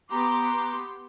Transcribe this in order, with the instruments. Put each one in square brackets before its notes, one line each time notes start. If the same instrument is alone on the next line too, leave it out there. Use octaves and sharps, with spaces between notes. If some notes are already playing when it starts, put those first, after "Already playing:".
[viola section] B3 G4 C6 [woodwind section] A#5 D6